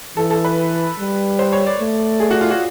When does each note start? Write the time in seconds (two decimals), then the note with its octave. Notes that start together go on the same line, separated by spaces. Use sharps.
0.17 E3 A4
0.30 A4
0.44 B4
0.99 G3
1.39 C5
1.53 C#5
1.67 D5
1.80 A3
2.20 G#4
2.31 F#4
2.41 F4
2.50 F#4